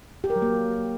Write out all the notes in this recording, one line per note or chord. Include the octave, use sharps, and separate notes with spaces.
G4
A#4
F#3
A#3